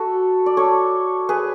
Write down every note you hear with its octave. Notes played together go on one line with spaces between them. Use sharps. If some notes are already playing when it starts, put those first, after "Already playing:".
Already playing: F#4 A4
D5
A4 C#5
G#4 B4